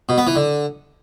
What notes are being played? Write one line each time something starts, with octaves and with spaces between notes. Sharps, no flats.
B2
B3
E3
D3